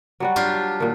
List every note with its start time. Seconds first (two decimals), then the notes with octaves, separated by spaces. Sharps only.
0.20 F#3 G3 F#4
0.36 D4 F4 G4
0.80 A#2 D#3